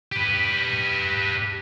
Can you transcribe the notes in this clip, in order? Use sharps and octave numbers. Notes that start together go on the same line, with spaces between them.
G4 B4